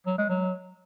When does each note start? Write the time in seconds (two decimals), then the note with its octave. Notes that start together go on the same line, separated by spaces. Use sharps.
0.06 F#3
0.18 G#3
0.29 F#3